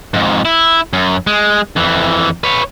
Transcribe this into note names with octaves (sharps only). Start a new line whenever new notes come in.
F2 G#2
E4
F#2
G#3
F2 E3
B4 C#5